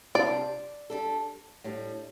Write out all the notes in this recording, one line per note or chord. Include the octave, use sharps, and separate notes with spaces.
C3 G3 D4 F4 D5
G3 D4 A4
A2 G3 D4